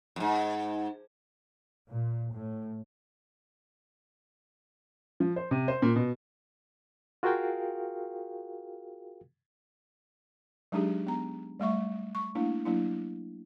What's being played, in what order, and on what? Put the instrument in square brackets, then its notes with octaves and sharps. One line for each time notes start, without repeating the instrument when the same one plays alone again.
[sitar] F2 G#2
[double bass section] A#2
A2
[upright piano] F3
C5
C3
C5
A#2
B2
[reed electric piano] F4 F#4 G#4 A#4 F5 G5
[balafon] F#3 G#3 D4 D#4 G4 G#4
B3 A#5
G3 A3 E5 C#6
C#6
A3 A#3 D4 E4
F#3 A#3 D4 E4